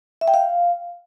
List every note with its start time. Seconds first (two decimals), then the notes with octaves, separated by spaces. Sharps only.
0.21 E5
0.28 G5
0.34 F5